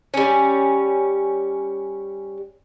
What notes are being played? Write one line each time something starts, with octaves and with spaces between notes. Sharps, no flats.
G3 C#4